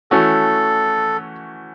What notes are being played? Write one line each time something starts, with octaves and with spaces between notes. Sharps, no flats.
E3 A3 C#4 F#4 A4